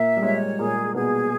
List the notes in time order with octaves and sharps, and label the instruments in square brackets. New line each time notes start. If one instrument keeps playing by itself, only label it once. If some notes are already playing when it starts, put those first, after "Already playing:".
Already playing: [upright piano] A#2 A#3 [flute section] E5
[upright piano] G3
[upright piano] G#3 [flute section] C#5
[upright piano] A#2 A#3 [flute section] G#4
[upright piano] B2 B3 [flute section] G#4